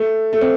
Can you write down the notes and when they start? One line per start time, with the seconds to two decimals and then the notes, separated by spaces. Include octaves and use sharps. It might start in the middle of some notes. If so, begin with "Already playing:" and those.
Already playing: A3
0.33 A3
0.41 C4